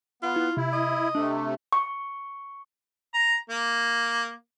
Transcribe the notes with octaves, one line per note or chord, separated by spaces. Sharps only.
B3 F4
E4
C3 E4
D#5
C3 A3 D4
C#6
A#5
A#3